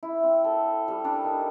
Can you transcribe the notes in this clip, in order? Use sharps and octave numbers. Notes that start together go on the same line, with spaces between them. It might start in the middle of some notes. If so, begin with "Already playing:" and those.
E4
C4
A4
G3
D4
D#3